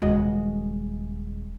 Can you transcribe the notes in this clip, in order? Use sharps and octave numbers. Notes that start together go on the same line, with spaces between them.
D#1 C#3 G#3 F#4 D#5